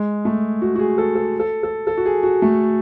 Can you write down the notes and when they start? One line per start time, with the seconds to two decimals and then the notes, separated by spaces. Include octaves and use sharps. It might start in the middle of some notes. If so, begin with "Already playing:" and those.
Already playing: G#3
0.25 A3
0.62 F#4
0.76 F#4
0.79 G#4
0.98 A4
1.15 A4
1.40 A4
1.63 A4
1.87 A4
1.97 F#4
2.06 G#4
2.23 F#4
2.42 A3